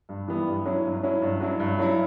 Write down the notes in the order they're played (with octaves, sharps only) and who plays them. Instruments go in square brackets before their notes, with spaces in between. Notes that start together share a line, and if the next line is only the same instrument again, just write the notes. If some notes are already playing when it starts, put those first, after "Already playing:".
[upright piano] G2
E3 G3 B3 E4
G2
F#3 C#4 E4
G2
F#3 C#4 E4
G2
F#3 C#4 E4
G2
F#3 C#4 E4